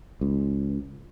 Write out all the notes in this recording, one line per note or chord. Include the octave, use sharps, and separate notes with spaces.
C#2